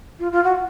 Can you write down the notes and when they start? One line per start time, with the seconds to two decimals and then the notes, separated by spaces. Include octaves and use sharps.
0.19 F4
0.32 F4
0.44 F#4